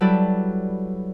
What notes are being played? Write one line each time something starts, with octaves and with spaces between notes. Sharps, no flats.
F#3 G3 E4 A4 B4 D5